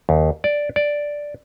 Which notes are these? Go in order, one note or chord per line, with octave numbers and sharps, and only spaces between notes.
D#2
D5
D5